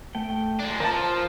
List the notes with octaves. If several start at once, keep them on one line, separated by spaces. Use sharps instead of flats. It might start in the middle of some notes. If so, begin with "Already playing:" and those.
A3 G5
G#3 D4
F3 A#4 A5
C5